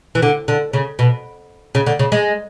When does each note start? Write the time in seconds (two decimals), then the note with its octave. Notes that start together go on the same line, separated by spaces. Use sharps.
0.15 E3
0.22 D3
0.48 D3
0.73 C#3
0.99 B2
1.75 C#3
1.86 D3
1.99 C#3
2.12 G#3